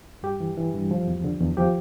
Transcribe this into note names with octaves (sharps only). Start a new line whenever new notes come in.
G2 G4
E3
E3
G2
F3
E2
D3
E2
F3 G4